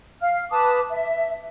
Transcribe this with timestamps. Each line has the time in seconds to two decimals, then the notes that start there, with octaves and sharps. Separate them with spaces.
0.21 F5 F6
0.50 B4 A5 D6 D#6
0.90 E5